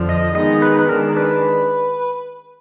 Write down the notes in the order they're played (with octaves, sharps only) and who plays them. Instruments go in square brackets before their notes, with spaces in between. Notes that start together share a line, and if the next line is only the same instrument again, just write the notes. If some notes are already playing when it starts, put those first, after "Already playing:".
Already playing: [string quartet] F2 D3 F3
[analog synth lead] D#5
[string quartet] D#3 G#3 B3 D#4 [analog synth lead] D#5
[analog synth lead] B4
B4
[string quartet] D#3 G#3 D4 [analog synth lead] A#4
[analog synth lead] B4